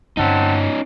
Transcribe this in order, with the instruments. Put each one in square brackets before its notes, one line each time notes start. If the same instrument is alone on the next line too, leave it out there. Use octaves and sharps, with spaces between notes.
[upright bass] G2 D3 [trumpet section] C4 F#5 A5 [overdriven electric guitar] C#4 D#4